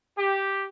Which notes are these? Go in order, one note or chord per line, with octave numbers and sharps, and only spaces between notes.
G4